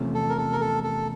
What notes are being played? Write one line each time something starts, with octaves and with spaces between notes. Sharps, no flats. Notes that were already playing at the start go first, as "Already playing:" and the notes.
Already playing: E2 C3 F3 A3 C#4
A4
A#4
A4
A#4
A4
A4